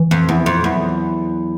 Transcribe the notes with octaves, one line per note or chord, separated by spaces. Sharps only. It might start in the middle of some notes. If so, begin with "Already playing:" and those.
Already playing: E3
F2
E2 F3
F2
E2 F#3